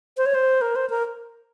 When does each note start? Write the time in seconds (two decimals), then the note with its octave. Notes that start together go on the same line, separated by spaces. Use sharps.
0.17 C5
0.26 C#5
0.34 C5
0.61 A#4
0.76 C5
0.90 A#4